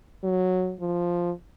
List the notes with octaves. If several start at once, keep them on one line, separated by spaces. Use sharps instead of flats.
F#3
F3